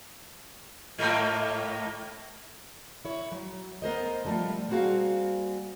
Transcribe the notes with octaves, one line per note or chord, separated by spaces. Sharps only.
G#2 A3 A#3
E4 C#5
F#3
B3 A#4 C5 D#5
D3 F3 G3 A3 F4
G3 A#3 C4 F#4 G#4 F5